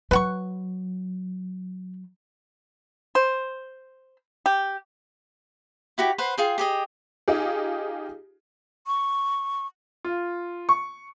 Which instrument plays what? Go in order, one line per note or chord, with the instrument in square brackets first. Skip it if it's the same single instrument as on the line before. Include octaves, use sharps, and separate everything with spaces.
[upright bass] F#3 [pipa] B4 F#5 C#6
[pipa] C5
G4
[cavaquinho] E4 F#4 G4 G5
B4 C5 F#5
F4 G#4 G5
G4 G#4 D#5
[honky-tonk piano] D#4 F4 G4 G#4
[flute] C#6
[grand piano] F4
C#6